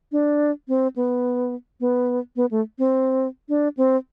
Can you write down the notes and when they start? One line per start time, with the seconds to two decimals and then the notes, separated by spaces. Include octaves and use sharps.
0.12 D4
0.68 C4
0.96 B3
1.80 B3
2.36 B3
2.51 A3
2.78 C4
3.49 D4
3.77 C4